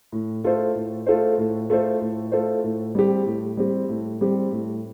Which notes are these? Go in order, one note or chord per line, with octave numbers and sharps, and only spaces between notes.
A2
A3 F4 A4 C5
A2
A3 F4 A4 C5
A2
A3 F4 A4 C5
A2
A3 F4 A4 C5
A2
G3 C4 G4
A2
G3 C4 G4
A2
G3 C4 G4
A2